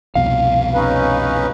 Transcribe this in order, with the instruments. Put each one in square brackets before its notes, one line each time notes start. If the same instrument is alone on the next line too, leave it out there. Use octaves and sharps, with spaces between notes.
[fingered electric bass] C2 F2 B2 [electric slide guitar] F5
[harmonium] C#4 D#4 B4